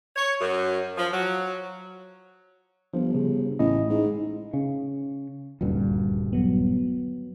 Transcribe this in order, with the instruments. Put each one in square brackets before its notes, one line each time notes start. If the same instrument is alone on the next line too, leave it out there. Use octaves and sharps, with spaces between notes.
[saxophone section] C#5
F#2
F3
F#3
[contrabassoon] G1 [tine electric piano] F3
[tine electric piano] C#3
[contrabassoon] A1 [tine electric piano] A2 E4 D#5
[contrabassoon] G#2
[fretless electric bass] C#3
D#1 D2 G2
[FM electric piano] F#3 B3